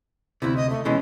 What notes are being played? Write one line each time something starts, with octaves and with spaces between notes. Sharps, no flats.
D2 C3 E4
D#5
A3
B2 E3 G#3 C#4